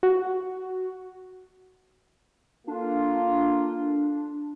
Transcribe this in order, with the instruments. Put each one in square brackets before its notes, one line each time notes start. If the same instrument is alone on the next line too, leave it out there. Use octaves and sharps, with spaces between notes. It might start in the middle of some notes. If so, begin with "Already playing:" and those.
[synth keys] F#4
[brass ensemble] A#3 F4 A4 [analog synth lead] D4